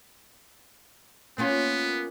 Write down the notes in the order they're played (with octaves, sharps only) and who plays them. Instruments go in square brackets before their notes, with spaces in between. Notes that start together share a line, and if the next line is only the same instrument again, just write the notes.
[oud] A#3 C#4 F4 [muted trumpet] B3